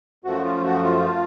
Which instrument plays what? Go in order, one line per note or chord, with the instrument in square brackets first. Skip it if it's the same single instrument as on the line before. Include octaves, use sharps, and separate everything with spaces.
[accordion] F#2 F3 A3 F#4
F4
F#4
F4